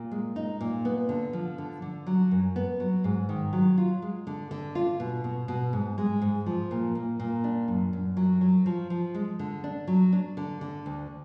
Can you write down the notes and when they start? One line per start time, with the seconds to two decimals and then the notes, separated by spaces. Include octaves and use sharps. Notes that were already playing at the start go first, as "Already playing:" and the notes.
Already playing: A#2
0.11 G#3
0.36 D#4
0.61 A#2
0.85 B3
1.09 D3
1.33 F3
1.58 D3
1.82 D3
2.07 F#3
2.31 F#2
2.56 B3
2.80 F#3
3.04 G#2
3.29 D#3
3.53 F#3
3.78 F4
4.02 G#3
4.27 D3
4.51 D3
4.75 F4
5.00 B2
5.24 B2
5.48 B2
5.73 G#2
5.98 G#3
6.22 G#2
6.46 F3
6.71 A#2
6.95 A#2
7.20 A#2
7.44 D4
7.68 F#2
7.93 F#2
8.17 F#3
8.41 F#3
8.66 F3
8.90 F3
9.14 G#3
9.39 D3
9.64 D4
9.87 F#3
10.13 D4
10.37 D3
10.61 D3
10.86 D2